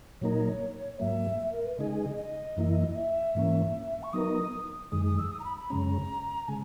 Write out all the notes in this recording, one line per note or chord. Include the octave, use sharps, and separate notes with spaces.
A#2 F#3 A#3 D#4 A#4 C#5
G#2 F#3 A#3 E5
E5
A#4
B4
C#3 G#3 D#4 G#4 D#5
D#5
F#2 E3 A#3 E4
E5
G#2 E3 A#3 C#4 E5
C#6
F#3 B3 D#4 A#4 D#6
F#2 D#3 G#3 D#6
D#6
E6
D#6
A#5
B5
B5
F#2 C#3 G#3 C#4 A#5
C#3 G#3 G#5